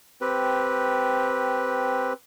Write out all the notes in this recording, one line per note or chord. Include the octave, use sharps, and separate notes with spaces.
C4 G4 B4